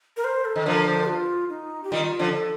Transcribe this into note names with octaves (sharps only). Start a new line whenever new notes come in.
A#4
C5
A4
D#3
D3 F3 A#4
C5
F4
D#4
G4
D#3 G3 F4
D3 F3
A4